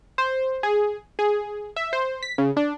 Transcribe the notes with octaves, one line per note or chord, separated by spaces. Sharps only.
C5
G#4
G#4
E5
C5
B6
C#3
D4